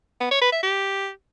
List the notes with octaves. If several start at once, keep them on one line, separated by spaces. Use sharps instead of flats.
B3
C#5
B4
E5
G4